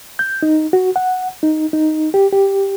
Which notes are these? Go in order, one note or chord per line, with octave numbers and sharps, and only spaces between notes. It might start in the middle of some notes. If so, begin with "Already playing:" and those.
G6
D#4
F#4
F#5
D#4
D#4
G4
G4